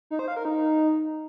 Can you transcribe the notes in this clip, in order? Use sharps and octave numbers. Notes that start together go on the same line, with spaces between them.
D#4
C5
F5
A#4
D#4